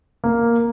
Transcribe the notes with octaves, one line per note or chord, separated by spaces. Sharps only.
A#3